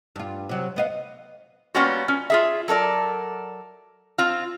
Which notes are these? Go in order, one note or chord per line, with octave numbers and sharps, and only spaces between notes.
G2 F4
C3 F#3
B3 D#5 F5
G3 A#3 B3 C#4 F4 F#4
C#4
F4 G#4 E5
F#3 A4 A#4 D5
C4 F4